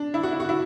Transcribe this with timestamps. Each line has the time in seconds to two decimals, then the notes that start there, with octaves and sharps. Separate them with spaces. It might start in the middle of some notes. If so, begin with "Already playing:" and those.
Already playing: D4
0.14 E4
0.23 F#4
0.32 E4
0.40 F#4
0.49 E4